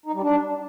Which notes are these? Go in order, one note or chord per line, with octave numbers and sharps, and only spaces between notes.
D#4
G3
D4